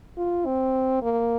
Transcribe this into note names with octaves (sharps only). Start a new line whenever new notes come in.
F4
C4
A#3